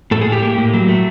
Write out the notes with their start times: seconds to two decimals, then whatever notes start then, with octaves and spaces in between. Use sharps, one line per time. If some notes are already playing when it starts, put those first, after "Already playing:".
0.11 A2 A4
0.21 G#4
0.26 A2
0.32 G4
0.42 A#3
0.58 A2
0.73 F#3
0.88 A3